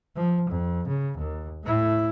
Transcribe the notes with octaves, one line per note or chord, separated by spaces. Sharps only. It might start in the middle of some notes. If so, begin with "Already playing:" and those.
F3
F2
C#3
D#2
A2 E4